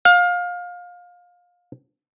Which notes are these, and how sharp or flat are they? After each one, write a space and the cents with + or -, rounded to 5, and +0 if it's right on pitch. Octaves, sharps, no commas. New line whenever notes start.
F5 +25